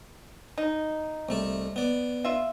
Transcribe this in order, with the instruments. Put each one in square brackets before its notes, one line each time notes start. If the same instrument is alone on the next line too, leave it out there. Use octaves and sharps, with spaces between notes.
[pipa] D#4
[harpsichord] C2 A3 A4
B3 D5
[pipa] F4 E5